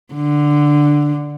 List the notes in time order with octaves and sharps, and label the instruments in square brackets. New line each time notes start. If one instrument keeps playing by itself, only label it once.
[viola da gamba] D3